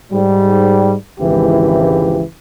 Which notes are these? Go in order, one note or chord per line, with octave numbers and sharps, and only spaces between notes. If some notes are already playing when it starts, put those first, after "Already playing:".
G#2 G3
G#1 C#2 E3 F3 E4 G4